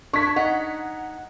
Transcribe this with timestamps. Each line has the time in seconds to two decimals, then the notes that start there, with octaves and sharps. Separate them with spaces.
0.13 D4 C#6 G#6 B6
0.36 D#4 F#5